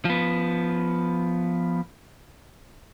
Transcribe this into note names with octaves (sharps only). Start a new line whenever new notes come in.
F3 B3